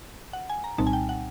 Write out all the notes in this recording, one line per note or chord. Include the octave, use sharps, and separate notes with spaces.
F#5
G#5
A#5
C2 A#2 G3 C4 D#4 A5
G#5
G5
F#5